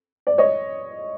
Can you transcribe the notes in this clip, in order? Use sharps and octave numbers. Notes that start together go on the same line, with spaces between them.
D5
C#5 D#5